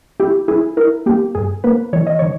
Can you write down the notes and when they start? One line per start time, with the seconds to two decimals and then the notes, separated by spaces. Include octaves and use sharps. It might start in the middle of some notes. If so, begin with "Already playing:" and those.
0.20 E4 G4
0.48 E4 G#4
0.77 E4 A#4
1.06 A#3 G4
1.35 G2 G#4
1.64 A#3 B4
1.93 E3 C#5
2.07 D#5
2.19 D#3 C#5